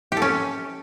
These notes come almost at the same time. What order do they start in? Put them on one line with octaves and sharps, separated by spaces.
G4 A4 C#4